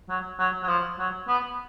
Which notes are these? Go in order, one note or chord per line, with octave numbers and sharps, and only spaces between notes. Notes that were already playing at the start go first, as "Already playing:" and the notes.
F#3
F#3
F#3
F3
F#3
B3